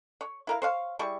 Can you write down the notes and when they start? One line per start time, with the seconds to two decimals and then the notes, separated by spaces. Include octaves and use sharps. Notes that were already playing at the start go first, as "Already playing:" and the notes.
0.21 C#5
0.47 E4 A#4 F5
0.62 C5 C#5 F5
0.99 G3 E4 G#4 C#6